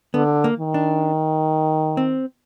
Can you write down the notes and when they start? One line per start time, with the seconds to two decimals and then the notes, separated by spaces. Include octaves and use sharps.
0.14 D3 B3
0.44 A#3
0.60 D#3
0.74 D4
1.97 C4